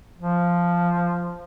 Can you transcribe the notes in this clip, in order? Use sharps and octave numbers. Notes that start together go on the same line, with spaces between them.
F3